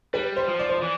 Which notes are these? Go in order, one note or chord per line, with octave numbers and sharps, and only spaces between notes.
G3 B4
C5
F3
D5
C5
E3 D5